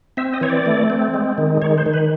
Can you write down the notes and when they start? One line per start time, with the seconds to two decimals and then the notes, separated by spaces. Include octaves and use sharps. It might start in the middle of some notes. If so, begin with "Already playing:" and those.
0.17 C4 E5
0.33 D#5
0.41 E3 C#5
0.50 D5
0.66 A3
0.90 C4
1.14 G#3
1.38 D#3
1.62 D#3 C#5
1.78 C5
1.86 D#3
1.94 B4